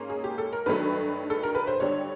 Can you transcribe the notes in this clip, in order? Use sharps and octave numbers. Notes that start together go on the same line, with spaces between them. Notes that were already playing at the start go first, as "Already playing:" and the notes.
Already playing: G#2 A#3 C#4
G#4
G4
A4
A#4
G2 D#3 F#3 A3 B4
A4
A#4
B4
C5
G2 D3 G3 C#5